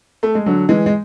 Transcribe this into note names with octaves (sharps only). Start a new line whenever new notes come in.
A3
G#3
D3 F#3
E3 G#3
G#3